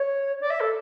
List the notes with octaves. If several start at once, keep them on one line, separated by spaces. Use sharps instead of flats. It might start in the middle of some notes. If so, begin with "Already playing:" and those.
Already playing: C#5
D5
E5
A4